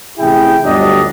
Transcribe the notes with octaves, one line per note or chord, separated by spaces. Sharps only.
A1 C3 E4 G#4 G5
G1 D2 F#3 G3 D4 D#5